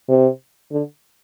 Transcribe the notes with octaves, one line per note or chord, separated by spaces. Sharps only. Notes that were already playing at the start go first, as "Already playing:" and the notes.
C3
D3